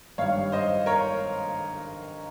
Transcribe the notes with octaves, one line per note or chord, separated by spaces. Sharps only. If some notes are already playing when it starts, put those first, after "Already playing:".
G#1 G2 G3 C#5 F5
C5 D#5
A#4 C#5